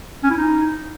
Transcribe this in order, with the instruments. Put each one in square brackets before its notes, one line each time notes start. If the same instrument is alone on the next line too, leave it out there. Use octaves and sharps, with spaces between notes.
[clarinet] C#4
E4
D#4